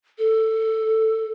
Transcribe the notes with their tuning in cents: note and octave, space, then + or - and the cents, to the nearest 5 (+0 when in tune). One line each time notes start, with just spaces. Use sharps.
A4 +10